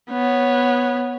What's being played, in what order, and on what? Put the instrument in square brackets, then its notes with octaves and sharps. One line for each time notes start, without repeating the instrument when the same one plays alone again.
[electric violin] B3 C#5